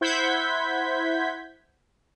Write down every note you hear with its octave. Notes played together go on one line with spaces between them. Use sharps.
E4 C5 F#5 G6 G#6 B6